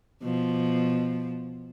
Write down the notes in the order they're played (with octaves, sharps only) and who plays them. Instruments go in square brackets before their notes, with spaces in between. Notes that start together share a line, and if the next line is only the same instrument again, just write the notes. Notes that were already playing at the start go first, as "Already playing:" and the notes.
[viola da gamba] B2 F3